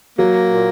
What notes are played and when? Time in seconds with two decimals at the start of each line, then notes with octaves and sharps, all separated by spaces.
0.18 F#3 A#3
0.49 A#2